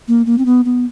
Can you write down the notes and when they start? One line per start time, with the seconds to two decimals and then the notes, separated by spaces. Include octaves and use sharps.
0.08 A#3
0.26 A#3
0.38 C4
0.46 B3
0.65 B3